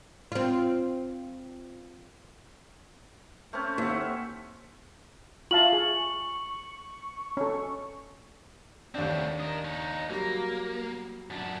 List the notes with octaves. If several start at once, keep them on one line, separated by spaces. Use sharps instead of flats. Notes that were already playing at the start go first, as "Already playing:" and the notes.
C4 F4
A3 C4 C#4
D#2 E5 F#5
F4 E5 F5 A5 F#7
G#4 C#6
C#4 A4
D#2 A3 C4 D4
A#4 D#5
D#4 C#5
F#3 G3 A#3 A#6
F#2 D4